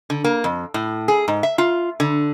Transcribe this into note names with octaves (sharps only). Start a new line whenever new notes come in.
D3
A#3
F2
A2
G#4
G#2
E5
F4
D3